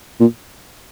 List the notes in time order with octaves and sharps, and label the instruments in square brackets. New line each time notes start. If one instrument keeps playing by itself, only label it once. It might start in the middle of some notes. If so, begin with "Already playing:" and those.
[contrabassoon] A#2